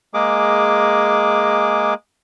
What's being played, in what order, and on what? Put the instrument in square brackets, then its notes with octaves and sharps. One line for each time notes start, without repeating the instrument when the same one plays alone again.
[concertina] G#3 A#3 G#4 D6